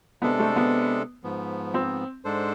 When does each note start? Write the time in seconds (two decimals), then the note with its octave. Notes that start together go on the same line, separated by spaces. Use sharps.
0.22 C3 G#3 B3 D4 A4
0.39 A3
0.56 B3
1.24 G#2 F3 B3
1.74 C4
2.25 G#2 G#3 D4 A4 C5